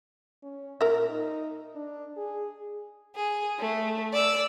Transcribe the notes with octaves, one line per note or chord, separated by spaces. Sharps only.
C#4
A#2 A#4 E5
D#4
D4
G#4
G#4
A3
D5 E6